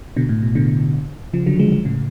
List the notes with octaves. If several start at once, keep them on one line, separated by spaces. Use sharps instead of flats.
B2 D3
A2
B2
B2 D3
C#3 F3
D3 F#3
F3 G#3
F3 G#3
A2 C#3